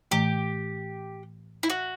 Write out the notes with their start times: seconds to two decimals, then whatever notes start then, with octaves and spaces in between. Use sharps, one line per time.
0.11 A2 E3 A3 G4
1.63 E4
1.70 F#4